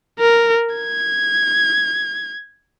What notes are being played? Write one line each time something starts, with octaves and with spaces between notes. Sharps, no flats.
A#4
G#6